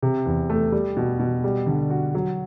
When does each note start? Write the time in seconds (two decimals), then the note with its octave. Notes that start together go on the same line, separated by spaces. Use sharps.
0.02 C3
0.26 E2
0.50 A3
0.72 G3
0.97 B2
1.19 B2
1.44 G3
1.66 D3
1.90 F#4
2.15 F#3